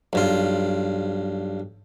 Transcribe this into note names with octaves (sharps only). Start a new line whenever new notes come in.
B1 G2 F4